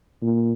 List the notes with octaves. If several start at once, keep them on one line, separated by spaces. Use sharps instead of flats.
A#2